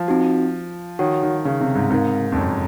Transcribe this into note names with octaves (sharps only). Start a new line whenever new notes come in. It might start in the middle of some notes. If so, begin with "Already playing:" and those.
Already playing: F3
C4 D#4 F#4
D#3 F#4 C#5 F#5
D#3
C#3
C3
G#2
G#2 C4 D#4 A#4 F5
F2
F#2